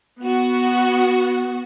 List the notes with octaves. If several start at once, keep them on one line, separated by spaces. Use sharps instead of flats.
B3 F#4